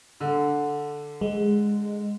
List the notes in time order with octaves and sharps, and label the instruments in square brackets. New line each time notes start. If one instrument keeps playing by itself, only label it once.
[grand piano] D3
[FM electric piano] G#3